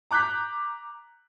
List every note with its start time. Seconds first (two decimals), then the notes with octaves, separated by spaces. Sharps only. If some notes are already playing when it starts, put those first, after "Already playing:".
0.11 A#5 D6 F#6 G6 B6